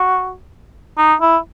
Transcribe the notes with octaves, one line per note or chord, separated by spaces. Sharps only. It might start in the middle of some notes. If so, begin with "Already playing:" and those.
Already playing: F#4
D#4
E4